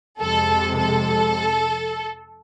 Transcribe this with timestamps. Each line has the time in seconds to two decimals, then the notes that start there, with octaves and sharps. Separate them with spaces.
0.20 F2 C3 G#3 A4
0.80 A4